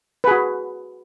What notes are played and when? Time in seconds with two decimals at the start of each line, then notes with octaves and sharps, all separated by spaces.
0.24 B4
0.28 G#4
0.31 F#4